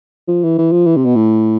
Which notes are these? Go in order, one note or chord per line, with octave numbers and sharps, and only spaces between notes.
F3
E3
E3
F3
E3
C3
B2
A2